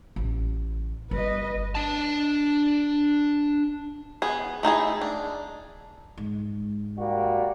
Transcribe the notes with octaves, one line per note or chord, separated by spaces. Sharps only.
A1
G1 B4 D#5
D4 A5
B3 G#4
A3 D#4 E4 G#4
D4
G#2
G3 A#3 F#4